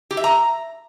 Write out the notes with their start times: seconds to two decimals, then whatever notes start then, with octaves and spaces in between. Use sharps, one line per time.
0.11 G4
0.17 E5
0.24 A#5